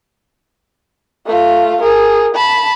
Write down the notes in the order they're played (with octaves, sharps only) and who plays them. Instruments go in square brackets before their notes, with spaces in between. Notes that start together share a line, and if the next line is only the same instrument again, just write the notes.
[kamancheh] A3 F4
G#4 A#4
A5 B5